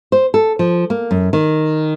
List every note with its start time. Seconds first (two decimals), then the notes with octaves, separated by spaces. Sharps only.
0.12 C5
0.34 A4
0.59 F3
0.90 A#3
1.11 F#2
1.33 D#3